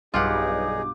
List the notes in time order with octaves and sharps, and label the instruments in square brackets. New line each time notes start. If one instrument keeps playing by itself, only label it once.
[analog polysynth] B1 G2 [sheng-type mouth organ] D#4 G#4 [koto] F4 G4 F#5 [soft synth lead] D6